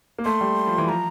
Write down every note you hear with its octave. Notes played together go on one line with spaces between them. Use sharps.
A#3
A3 C6
G3
F3
E3
F3 A#5